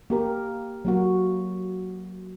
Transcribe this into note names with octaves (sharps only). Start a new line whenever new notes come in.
A#3 G4 A#4
F#3 A#3 F#4